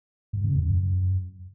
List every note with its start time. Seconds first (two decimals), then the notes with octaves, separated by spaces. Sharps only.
0.33 G#2
0.44 C#3
0.55 F2
0.66 F#2